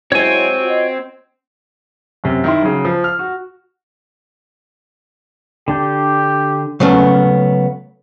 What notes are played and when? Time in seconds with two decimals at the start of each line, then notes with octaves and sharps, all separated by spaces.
0.12 F#3 G#3 C4 E4 C#5 G#5
0.61 F4 F#4 D#5
2.24 F#2 C3
2.44 D#3 E4 C6
2.62 C#3 F#3
2.85 F3
3.04 F6
3.19 F#4
5.68 D3 D4 G4 G6
6.80 C#3 F#3 A3 B3 C#4